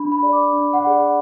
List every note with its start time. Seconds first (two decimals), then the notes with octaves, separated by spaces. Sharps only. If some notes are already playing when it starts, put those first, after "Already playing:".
Already playing: D4 B5
0.12 B5
0.22 G#4 D5
0.33 D6
0.53 D4
0.73 F#5
0.83 G#4 D5
0.93 F#5